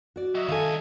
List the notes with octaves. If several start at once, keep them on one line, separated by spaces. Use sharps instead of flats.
F#4 D5
F#3 D#5 E5
C2 D#3 A4 F5 G#5